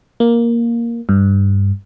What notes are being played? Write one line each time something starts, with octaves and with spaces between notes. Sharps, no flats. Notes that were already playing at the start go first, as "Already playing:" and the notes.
A#3
G2